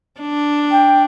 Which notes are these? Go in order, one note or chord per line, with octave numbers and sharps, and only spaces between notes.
D4
G5